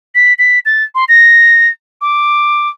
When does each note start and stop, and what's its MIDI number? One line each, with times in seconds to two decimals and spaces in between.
0.15 0.33 95
0.38 0.59 95
0.65 0.84 93
0.95 1.04 84
1.08 1.68 94
2.01 2.69 86